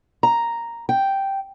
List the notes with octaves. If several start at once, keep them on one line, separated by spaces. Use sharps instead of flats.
A#5
G5